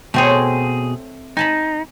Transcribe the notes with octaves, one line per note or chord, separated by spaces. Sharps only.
B2 A3 C4 G#4 C#5
D#4 G#5 A5 B5